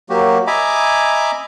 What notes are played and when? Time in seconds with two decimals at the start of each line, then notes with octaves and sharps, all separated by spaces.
0.10 F#3 A#3 F#4 G4
0.47 D#5 E5 G#5 A#5 B5 D6